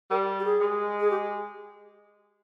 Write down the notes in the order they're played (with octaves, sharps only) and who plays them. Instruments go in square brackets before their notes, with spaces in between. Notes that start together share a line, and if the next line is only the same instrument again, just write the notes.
[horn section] G3 [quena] A#4
[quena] G4
G#4
[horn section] G#3
[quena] G#4
G4